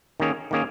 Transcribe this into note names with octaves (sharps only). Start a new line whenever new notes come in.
D#3 A#3 C#4 G#4
D#3 A#3 C#4 G#4